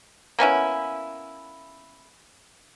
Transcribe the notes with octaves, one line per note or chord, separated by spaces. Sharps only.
A#3 B3 C#4 E4